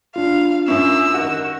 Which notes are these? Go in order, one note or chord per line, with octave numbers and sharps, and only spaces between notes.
D4 F4 F5
F#2 C#4 E4 E6
D#3 F#4